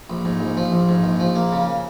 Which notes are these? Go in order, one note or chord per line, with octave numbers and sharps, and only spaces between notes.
A#1
G#2
A#1
F3
A#1
G#2
A#1
F3
A#3
C#3